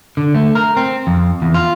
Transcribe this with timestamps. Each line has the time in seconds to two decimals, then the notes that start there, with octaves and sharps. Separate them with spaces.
0.17 D3
0.35 A3
0.55 A#4
0.77 C4
1.07 F2
1.42 E2
1.54 F4